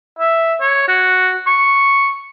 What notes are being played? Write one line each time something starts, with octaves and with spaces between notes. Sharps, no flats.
E5
C#5
F#4
C#6